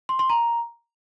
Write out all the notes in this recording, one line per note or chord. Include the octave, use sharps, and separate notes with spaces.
C6
C6
A#5